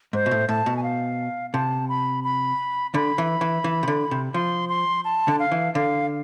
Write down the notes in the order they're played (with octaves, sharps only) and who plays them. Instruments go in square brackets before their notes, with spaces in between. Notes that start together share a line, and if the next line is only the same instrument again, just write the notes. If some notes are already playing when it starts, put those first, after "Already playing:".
[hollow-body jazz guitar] G#2 [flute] C5
[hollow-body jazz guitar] B2
A2
[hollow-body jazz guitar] A2 [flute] A5
[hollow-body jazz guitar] B2
[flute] G#5
F5
[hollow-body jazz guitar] C3 [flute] A5
[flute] B5
B5
[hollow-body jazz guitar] D3 [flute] B5
[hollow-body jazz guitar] E3
E3
E3
C3
D3
C3
[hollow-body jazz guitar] F3 [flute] C6
[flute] C6
A5
[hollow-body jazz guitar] D3
[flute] F5
[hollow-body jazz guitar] E3
[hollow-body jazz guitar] D3 [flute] F5